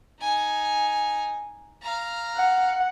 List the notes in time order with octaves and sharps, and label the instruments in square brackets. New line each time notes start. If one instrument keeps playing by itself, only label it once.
[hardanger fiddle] D#4 G#5
F5 A#5
[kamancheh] F#5